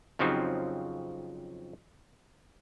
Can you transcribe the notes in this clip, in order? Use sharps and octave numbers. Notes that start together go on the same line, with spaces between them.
F2 C#3 F3 F#3 C4 D#4